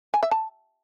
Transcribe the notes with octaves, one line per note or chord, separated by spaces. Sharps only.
G#5
E5
A5